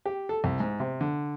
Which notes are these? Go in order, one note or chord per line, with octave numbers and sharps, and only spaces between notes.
G4
A4
C2
G#2
C3
D3